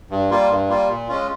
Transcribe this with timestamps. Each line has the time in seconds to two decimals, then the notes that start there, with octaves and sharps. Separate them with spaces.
0.11 G2
0.30 G3 A#3 F4
0.50 G2
0.69 G3 A#3 F4
0.88 A#2
1.08 G#3 C#4 F4